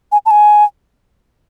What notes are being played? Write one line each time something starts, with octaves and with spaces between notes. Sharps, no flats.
G#5
A5
G#5